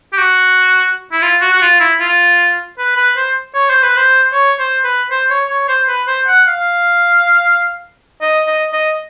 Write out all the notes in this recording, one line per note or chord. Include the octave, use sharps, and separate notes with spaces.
G4
F#4
E4
F4
F#4
F#4
F4
E4
F4
B4
B4
C5
C#5
C5
B4
C5
C#5
C5
B4
C5
C#5
C#5
C5
B4
C5
F#5
F5
D#5
D#5
D#5